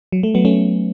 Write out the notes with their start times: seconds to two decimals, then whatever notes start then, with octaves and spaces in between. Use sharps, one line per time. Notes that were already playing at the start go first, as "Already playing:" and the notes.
0.12 F#3
0.23 A3
0.35 F#3 B3
0.45 A3 C#4